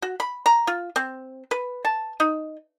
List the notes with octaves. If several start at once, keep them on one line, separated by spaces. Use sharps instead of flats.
F#4
B5
A#5
F4
C4
B4
A5
D#4